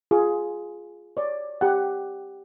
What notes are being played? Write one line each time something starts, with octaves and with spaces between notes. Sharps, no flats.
F4 G#4
C#5 D5
G4 F#5